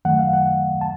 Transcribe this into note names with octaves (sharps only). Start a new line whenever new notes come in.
F#2 D#3 F#3 A3 F#5
F5
F#5
A5